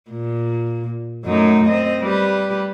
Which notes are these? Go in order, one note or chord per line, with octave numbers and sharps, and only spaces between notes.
A#2
F#2 A3 D#4
C4 D#5
G3 G4 B4